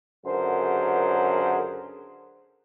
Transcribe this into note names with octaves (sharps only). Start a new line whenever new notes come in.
C#2 F#2 D3 G#4 A#4 C5